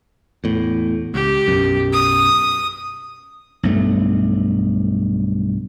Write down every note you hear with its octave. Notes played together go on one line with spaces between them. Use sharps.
E2 A2
C#2 G4
B1 F#2
D#6
B1 G2 A3